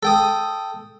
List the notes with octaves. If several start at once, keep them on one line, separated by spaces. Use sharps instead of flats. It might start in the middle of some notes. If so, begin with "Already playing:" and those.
A4 G5 D#6